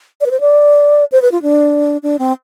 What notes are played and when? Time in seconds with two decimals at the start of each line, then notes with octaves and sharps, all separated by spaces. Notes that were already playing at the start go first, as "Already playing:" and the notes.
0.21 D5
0.26 B4
0.31 C5
0.41 D5
1.12 C5
1.22 B4
1.32 F4
1.42 D4
2.03 D4
2.19 C4